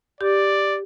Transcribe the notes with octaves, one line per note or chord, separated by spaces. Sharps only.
G4 D5